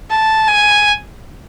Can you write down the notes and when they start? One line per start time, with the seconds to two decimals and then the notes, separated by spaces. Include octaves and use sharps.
0.10 A5
0.49 G#5